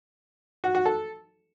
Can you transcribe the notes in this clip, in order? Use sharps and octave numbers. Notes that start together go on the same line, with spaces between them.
F#4
F#4
A4